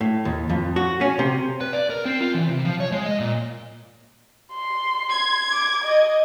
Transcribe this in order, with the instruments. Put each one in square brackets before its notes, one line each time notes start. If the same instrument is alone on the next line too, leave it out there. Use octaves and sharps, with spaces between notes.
[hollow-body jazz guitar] A2
D#2
F2
F#4
C#4
C3
[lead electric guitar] B4
D5
A#4
C4
F4
E3
C3
F3
C#5
G#3
D#5
A#2
[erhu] C6
[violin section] G#6
[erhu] D6
D#5